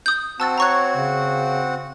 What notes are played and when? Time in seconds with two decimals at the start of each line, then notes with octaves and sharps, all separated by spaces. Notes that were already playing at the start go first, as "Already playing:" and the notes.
0.06 D#6 G6
0.40 C4 F#4 F#5 A5 E6 A6
0.58 C#5 A#5 C#6 F#6
0.96 C#3